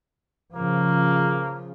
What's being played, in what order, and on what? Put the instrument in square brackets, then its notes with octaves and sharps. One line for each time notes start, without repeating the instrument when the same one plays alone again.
[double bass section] C#3 F3 [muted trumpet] A#3